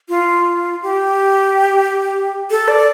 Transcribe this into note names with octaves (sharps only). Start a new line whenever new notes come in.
F4
G4
A4
D5